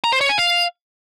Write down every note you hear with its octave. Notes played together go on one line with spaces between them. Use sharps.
A#5
C5
C#5
G#5
F5